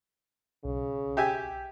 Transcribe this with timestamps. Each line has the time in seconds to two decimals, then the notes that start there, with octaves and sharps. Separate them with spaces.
0.65 B1 C#3
1.17 G4 E5 G#5